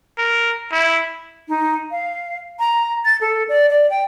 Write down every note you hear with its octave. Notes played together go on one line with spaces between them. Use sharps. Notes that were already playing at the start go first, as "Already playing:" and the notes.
A#4
E4
D#4
F5
A#5
A6
A4
D5
D5
G5